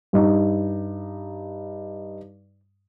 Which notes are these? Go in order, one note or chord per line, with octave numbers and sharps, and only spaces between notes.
G2 D#4